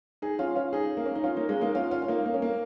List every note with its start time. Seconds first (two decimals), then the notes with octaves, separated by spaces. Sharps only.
0.22 D#4 G#4
0.39 C#4 F4
0.55 C#4 F4
0.73 D#4 G#4
0.97 A#3
1.06 C#4
1.15 D#4
1.24 C#4 F4
1.36 A#3 D#4
1.49 G#3 C#4
1.61 A#3 D#4
1.75 C#4 F4
1.91 C#4 F4
2.02 F4
2.08 A#3 D#4
2.26 A#3
2.34 C#4
2.42 A#3